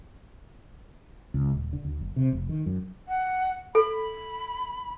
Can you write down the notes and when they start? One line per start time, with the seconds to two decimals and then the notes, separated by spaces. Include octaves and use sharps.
1.34 C#2
1.54 D#1
1.73 D3
1.85 D2
2.01 F#1
2.16 C3
2.33 F1
2.49 D#3
2.66 F#2
3.08 F#5
3.75 A4 B5